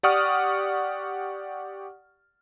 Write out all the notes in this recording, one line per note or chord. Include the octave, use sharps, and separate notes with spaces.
G4 D5 F#5 C#6 D#6 F6